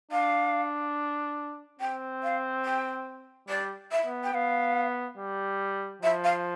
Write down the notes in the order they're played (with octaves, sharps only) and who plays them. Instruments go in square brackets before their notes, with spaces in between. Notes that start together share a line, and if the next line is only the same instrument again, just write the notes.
[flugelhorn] D4 [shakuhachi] F5
[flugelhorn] C4 [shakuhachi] G5
[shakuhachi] F5
G5
[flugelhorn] G3 [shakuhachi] D5
[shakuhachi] E5
[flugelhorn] B3
[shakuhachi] G5
[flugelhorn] B3 [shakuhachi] F5
[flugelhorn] G3
[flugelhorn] F3 [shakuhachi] E5
[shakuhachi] F5